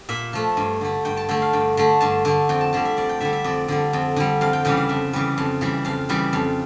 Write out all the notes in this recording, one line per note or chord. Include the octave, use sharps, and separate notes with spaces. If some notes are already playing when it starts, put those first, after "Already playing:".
Already playing: G4
A#2 E5
F3 A3
G2
D3 A3
G2 G5
A5
D3 A3 G5
F5
G2 G5
D3 A3
G2 A5
D3 A3
F2 G5
A5
D3 G3 A5
E5
F2 D5
G5
D3 G3 E5
E5
F2 D5
D3 G3
F2
D3 G3
F2 F5
G5
C#3 E3 G3 G5
F5
F2 E5
C#3 E3 G3
F2
C#3 E3 G3
F2 F5
C#3 E3 G3
F2